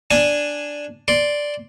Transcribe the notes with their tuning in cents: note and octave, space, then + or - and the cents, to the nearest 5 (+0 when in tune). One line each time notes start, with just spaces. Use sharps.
D4 +0 G#5 +0
D5 +0 C6 +0